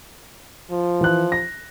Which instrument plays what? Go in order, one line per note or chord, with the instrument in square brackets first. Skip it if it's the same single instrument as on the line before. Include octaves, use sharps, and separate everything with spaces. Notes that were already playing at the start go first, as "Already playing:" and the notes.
[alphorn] F3
[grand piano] E3 F#6
A#6